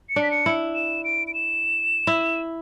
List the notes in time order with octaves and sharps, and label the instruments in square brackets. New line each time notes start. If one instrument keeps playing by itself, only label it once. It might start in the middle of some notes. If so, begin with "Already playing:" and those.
[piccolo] C#7
[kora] D4
[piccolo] B6
C#7
[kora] E4
[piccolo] E7
D7
D7
E7
[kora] E4